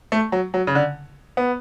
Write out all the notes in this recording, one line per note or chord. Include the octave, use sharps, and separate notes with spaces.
A3
F#3
F#3
C#3
D3
B3